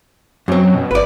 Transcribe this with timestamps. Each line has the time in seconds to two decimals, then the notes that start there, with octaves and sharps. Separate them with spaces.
0.48 F#2 F#3 C4
0.75 B2
0.91 G1 B4 D5